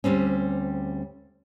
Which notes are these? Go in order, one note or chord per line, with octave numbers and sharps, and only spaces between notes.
D2 G3 C4 C#4